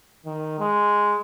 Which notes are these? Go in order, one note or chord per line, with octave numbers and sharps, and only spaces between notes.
D#3
G#3